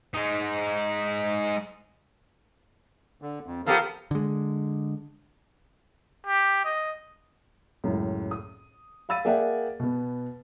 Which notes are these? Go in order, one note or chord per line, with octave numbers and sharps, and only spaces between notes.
G#3 D#4
D3
F2
F3 B3 G4 A4 A#4 F5
D3 G#3
G4
D#5
C#2 F#2 A2
D#6
F5 B5 E6 A6 D#7
A#3 G#4 D5 E5 F#5 G5
B2 B3